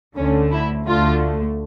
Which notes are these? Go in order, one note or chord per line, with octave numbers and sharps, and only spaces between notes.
D2 D3 A3 C#4
E4
D2 D3 A3 F4